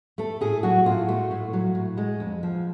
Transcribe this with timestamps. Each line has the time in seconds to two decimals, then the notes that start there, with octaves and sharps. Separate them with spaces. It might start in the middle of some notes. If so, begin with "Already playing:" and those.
0.18 A3 A4
0.41 A2 G#4
0.63 F#3 F#4
0.86 A2 F4
1.08 A3 F#4
1.31 A2
1.53 F#3
1.75 A2
1.97 G#3
2.20 F2
2.43 F3